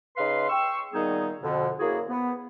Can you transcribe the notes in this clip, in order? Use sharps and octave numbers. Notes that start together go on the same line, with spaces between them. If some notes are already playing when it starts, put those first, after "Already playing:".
C#3 D#4 B4 F5 C6
G5 C#6 E6
A#2 D#3 G3 B3 D#4 G#4
F2 B2 D3
F#2 A#3 E4 F#4 G#4
B3